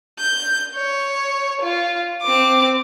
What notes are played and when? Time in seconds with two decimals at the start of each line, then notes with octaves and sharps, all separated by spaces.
0.19 G6
0.76 C#5
1.62 F4
2.22 C4 D6